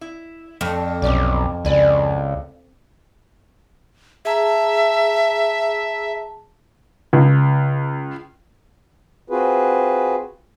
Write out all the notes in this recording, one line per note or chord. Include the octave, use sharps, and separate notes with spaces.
E4
F2 A3 D4
B1 C3 C#4 D5
C#2 E4 D5 G#5
G#4 E5 A5 A#5
C#2
C4 F4 F#4 G#4 B4